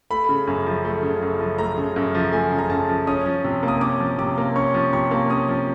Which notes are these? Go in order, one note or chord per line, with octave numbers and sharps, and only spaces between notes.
A3 B5
C#3
F#2
F3
A3
C#3
F#2
F3
A3 A#5
C#3
F#2
F3
A3 G#5
C#3
A#5
F#2 A5
F3
C#4 D#6
F3
C3
A#3
D#6
C#4 D6
F3
C3 D6
A#3
C#4 C#6
F3
C3 C#6
A#3
C#4 D#6
F3